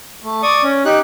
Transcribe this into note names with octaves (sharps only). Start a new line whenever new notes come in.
A3
D5 C#6 D#6
C#4
D#4 G4 F#6